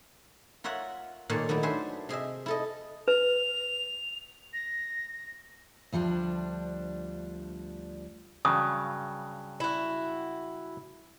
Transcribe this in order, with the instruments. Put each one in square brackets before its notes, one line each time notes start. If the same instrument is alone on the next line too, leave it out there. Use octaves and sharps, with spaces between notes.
[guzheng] F4 A#4 C#5 E5 F#5
A#2 D#3 A4 C#5 D5 F5
D#3 F#3 A3 E4
D4 A4 B4 C5 E5 G#5
C3 G#4 D#5 E5
E4 A4 D#5
[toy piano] B4 [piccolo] F7
[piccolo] A#6
[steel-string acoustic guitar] D2 F3 G3 D4
[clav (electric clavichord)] G2 C#3 F#3 [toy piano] D#6
[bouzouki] E4 F#4